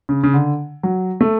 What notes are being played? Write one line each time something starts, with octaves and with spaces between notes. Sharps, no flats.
C#3
C#3
D3
F#3
A3